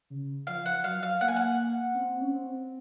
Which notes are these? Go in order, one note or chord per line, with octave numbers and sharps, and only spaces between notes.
C#3
F3 F5
F#5
F#3 F5
F5
A#3 F#5
G#5
F#5
C4
C#4
C4